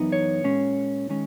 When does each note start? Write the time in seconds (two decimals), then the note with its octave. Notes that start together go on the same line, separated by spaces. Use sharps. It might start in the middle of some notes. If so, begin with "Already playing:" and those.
Already playing: F#2 E3 B3 D#4
0.12 C#5
0.44 A#2 G#3 C#4
1.09 D#3 G#3 C#4